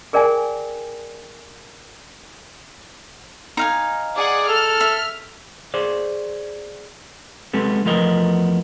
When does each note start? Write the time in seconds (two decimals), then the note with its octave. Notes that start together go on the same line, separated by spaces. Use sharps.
0.13 G#4 A#4 D5 G5 G#5
3.57 D#4 F5 G#5
4.17 G#4 D5 F#5
4.49 A4 F6
4.81 E5
5.74 G#4 C5 D5
7.53 G#3 B3 C4 G4 A4
7.85 E2 F3 A3 B3 A#4 D#5